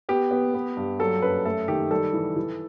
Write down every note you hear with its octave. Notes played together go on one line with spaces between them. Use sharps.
B3 G4
B3
B3
G2
F#3 A4
F#2 B4
A3 A4
D#3 G4
G3 A4
E3
E3